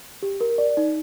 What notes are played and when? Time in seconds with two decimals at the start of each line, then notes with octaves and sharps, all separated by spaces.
0.22 G4
0.41 A#4
0.58 D5
0.77 D#4